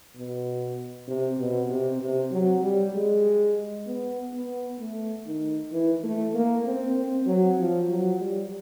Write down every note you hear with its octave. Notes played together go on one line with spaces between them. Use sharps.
B2
C3
B2
C3
C3
F#3
G3
G#3
B3
B3
A3
D#3
E3
A3
A#3
C4
C4
F#3
F3
F#3
G3